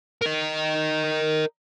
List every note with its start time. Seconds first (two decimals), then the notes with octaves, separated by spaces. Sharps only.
0.22 A#4 D#5